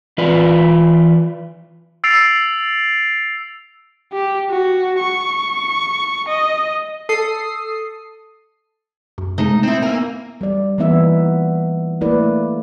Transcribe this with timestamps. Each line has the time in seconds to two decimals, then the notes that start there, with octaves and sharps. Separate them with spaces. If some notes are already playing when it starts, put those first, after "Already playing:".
0.18 E3 F4 B4 D5
2.04 E6 A6 C7 D7 F7
4.13 G4
4.50 F#4
5.00 C#6
6.29 D#5
7.09 A4 D#6 C7
9.18 F#2
9.38 C3 G#3 A3 D#4
9.63 C4 D#4 E4
9.82 A#3 B3 A#4 G#5 E6
10.41 G3 D5
10.78 E3 A#3 B3 D#4 E5
12.01 A3 A#3 E4 B4 D5